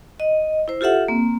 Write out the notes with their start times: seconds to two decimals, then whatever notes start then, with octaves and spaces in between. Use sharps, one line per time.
0.20 D#5
0.68 E4 C5
0.81 F4 G4 A4 E5 F#5
1.08 A#3 C4